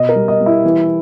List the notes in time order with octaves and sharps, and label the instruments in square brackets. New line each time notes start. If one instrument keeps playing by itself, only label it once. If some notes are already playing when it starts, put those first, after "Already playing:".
Already playing: [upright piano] B2 D#5
A#4
G3
D#5
G3
E4
E3